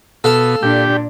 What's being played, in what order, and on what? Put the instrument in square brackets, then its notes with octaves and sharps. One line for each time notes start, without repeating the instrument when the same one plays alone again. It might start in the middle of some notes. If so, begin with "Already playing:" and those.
[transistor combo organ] B2 [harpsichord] A4 F5
[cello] A#2 D4 [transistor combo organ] G4